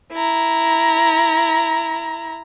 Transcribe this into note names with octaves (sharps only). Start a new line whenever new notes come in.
E4 A#5